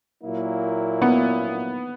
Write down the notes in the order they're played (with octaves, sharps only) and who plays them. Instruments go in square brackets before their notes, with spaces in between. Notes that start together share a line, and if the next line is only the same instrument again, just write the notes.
[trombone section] A#2 F#3 A#3 E4
[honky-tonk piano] B3